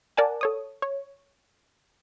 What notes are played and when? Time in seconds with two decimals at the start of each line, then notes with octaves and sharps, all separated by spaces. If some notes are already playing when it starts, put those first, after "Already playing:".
0.17 A#4 D5 F#5 G#5 A5
0.41 A4 C#5 D#6
0.82 C#5